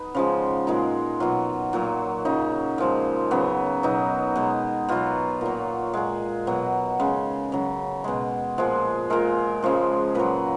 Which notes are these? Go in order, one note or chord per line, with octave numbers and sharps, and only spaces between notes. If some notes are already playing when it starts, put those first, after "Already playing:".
Already playing: B3 D#4
C#3 F3 G#3
A#2 G#3 D#4
B2 F#3 F4
A#2 F#3
C#3 F#3 D#4
A#2 F3 G#3
C#3 F#3 B3
B2 F#3 D#4
B2 G#3
B2 F#3 F4
A#2 F#3
A#2 G#3
B2 F#3
C#3 G#3
C#3 F#3
B2 G#3
A#2 F3 G#3
A#2 G#3 A#4
C#3 F3 G#3
A#2 F#3 B4